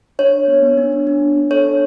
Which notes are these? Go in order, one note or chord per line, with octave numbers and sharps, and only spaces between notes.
D4 C#5
D4
B3
B3
D4
D4
D4
B3
D4
A4 C#5
D4